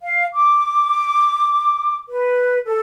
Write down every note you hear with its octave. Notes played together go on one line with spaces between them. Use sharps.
F5
D6
B4
A4